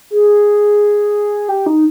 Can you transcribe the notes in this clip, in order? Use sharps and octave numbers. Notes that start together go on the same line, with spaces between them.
G#4
G4
D#4